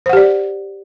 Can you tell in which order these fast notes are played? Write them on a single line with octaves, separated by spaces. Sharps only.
C5 F#5 G4 D5